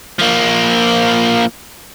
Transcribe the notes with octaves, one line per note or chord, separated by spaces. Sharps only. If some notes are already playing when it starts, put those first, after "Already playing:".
F3 A#3